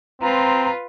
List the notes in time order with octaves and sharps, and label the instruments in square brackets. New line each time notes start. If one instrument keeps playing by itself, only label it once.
[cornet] C4 [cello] F4 B4 [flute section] A#5